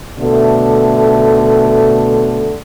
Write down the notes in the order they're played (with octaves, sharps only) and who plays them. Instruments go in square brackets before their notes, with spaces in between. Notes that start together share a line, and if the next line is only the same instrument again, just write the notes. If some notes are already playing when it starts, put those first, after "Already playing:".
[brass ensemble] B2 D3 A3